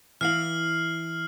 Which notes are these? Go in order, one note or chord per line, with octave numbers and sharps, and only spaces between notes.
E3 E4 F5 F6 C7 F#7